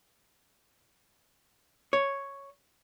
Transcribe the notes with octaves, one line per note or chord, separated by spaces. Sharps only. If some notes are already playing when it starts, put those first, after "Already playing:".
C#5